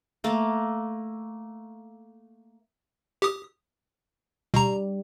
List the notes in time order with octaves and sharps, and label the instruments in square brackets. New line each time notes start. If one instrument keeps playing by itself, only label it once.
[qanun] A3 A#3
[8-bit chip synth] G4 D#6
[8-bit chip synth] B2 A#5 [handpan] G3